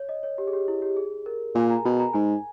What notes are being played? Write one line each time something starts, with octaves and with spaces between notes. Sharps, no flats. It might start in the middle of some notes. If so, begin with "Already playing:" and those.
Already playing: C#5
D#5
C#5
G4
G#4
G4
E4
G4
G#4
A#4
A#2 G#5
A#5
B2 B5
A#5
G#2 G#5